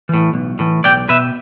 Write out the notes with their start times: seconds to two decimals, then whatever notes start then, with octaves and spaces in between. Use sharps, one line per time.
0.09 A2 E3
0.34 B1
0.59 A2 E3
0.84 B1 D5 G5
1.09 B2 B4 E5